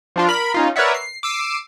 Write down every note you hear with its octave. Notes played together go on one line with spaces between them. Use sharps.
F3 D4 F4
A#4 B5
C#4 D#4 F4
A#4 B4 C#5 D5 E5 F#5
C7
D6 E6 C7 D#7